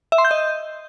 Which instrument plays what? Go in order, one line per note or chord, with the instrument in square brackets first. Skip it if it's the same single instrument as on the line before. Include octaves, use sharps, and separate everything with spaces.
[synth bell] E5
C6
G6
D#5